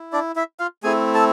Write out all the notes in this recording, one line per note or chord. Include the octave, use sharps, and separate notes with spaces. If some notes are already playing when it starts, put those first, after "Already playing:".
Already playing: E4
D4 D5
E4 E5
F4 F5
A3 C4 E4 G#4 G#5
A4 A5